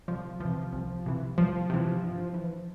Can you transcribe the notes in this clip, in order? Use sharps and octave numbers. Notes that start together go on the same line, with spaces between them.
C2 F3
C3 E3 F3
C2
C3 E3
C2 F3
C3 E3
G2
E3